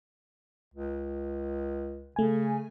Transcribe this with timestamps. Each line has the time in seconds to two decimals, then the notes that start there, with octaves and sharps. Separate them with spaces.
0.74 C#2
2.16 C#3 A3 G#5